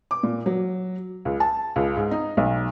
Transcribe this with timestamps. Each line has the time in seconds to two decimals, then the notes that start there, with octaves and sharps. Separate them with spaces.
0.11 D6
0.23 A#2
0.46 F#3
1.25 C#2
1.40 A5
1.76 C#2
1.97 G#2
2.11 D#4
2.37 B1